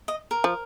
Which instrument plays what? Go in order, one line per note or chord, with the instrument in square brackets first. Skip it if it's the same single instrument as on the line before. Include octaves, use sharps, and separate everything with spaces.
[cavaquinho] D#5
A#4
[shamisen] F3